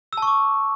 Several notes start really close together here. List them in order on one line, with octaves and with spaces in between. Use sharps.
E6 A5 C#6 D6